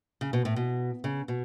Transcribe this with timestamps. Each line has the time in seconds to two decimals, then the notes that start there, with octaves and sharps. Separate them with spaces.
0.21 C#3
0.33 B2
0.45 A2
0.56 B2
1.04 C#3
1.28 B2